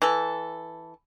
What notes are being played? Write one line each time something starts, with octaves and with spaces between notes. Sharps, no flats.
E3 A4